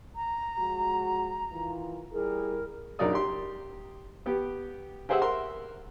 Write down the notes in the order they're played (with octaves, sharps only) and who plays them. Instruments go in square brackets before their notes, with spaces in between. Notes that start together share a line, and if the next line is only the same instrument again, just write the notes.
[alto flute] A#5
[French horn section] F3 G#3 F#4
D#3 E3 F4
[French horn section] G3 E4 G#4 [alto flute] A#4
[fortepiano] A#1 F#2 D#4 A#4 D5 D#6
G4 C6
B3 G4
G4 G#4 C5 E5 F#5 E6
A#4 E5 F#5 C6